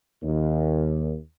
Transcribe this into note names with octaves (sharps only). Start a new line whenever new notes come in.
D#2